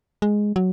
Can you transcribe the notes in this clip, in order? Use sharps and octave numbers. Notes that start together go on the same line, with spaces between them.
G#3
F#3